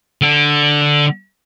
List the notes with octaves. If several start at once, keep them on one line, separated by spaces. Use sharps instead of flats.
D3